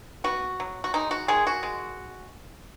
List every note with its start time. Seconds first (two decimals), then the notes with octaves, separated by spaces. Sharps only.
0.24 B3 F#4
0.60 F#3
0.84 F#4
0.94 G#3 D#4
1.11 F#4
1.28 D#3 G#3 G#4
1.47 F#4
1.63 G#3